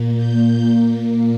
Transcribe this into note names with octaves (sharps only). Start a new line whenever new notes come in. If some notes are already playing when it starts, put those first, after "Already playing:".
Already playing: A#2 A#3
G6